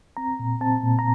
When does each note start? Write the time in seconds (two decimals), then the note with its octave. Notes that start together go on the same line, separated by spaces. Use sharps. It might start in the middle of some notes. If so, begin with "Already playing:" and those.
0.17 C4 A#5
0.39 A#2
0.61 C4 A5
0.83 A#2
0.99 A#5